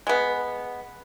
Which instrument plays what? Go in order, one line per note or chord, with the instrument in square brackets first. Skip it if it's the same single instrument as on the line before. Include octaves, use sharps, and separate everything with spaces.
[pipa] G#3 B3